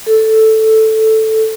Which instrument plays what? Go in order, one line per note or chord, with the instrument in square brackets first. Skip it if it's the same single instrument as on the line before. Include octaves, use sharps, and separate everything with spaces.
[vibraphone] A4